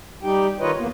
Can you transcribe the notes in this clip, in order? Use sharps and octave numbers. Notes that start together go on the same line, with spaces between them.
G3 D#4 G4 G5
D#3 D#4 F4 B4 C#5 D#5
E2 A#3 B3